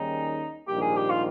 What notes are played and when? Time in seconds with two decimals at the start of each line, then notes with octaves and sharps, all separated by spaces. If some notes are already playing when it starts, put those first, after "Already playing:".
Already playing: D#2 D#3 G3 C#4 D#4 G#4
0.67 A#1 G#2 D#3 G3 A#3 G4
0.81 G#4
0.96 G4
1.10 F4